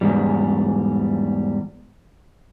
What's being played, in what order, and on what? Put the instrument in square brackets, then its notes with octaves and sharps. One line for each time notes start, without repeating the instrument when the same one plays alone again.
[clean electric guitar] E2 G#2 G3